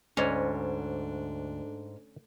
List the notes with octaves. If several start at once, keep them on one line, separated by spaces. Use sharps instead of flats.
D2 G#2 C#4 D4 D5 G#5